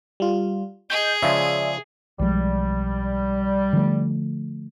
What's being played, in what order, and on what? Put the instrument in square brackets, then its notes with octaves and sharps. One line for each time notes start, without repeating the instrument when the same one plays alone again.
[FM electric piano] G3 F4
[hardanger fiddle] G#4 [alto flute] D#5 [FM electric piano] G6
[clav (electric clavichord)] C#3 F3 G#3 [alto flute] D5 [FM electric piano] E5
[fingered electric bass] B1 F3 G#3 [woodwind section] G3
[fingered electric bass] D3 F3 A3